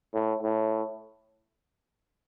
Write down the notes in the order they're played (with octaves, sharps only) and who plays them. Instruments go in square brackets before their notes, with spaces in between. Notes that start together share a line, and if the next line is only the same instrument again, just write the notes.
[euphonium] A2
A2